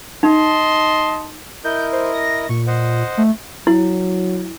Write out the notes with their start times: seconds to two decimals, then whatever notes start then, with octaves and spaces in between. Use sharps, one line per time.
0.23 D#4 D#5 A5 C6
1.64 E4 A#4 D#5 G6
1.92 C5
2.14 A#6
2.49 A#2 C#6
2.67 C5 D#5 F#5
3.18 A3
3.67 F#3 E4